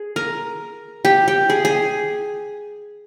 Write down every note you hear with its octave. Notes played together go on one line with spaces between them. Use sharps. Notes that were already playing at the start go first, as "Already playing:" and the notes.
Already playing: G#4
A#4
G4
G4
G#4
G#4